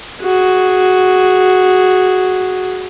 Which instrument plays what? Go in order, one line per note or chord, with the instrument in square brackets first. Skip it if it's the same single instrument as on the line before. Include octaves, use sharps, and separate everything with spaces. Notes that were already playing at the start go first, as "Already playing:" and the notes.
[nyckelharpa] F#4 G#4